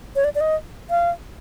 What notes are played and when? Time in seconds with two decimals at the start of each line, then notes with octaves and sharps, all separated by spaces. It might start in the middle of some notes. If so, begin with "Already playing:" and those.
0.16 C#5
0.24 D5
0.35 D5
0.41 D#5
0.90 F5